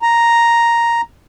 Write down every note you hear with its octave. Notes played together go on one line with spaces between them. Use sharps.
A#5